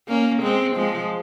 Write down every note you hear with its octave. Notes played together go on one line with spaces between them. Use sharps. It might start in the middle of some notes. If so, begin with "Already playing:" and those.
A#3 C#4
G#3 C4
F3 G#3